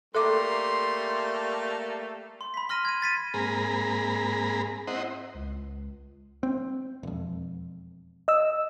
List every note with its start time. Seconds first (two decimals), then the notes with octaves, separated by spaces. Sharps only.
0.15 G3 A3 A#3 A4 E5 C6 D6
2.41 C6
2.54 B5 B6
2.69 C6 F6 A#6 D#7
2.85 G#6 D#7
3.02 A6 B6 D#7
3.34 G#2 A#3 C4 G#4 A#5 B5
4.87 C4 E4 C5 D#5 F#5
5.34 C#2
6.43 C4
7.03 E1 F2
8.28 D#5 E6